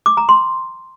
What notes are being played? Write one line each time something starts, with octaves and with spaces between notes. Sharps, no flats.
D6
A#5
C6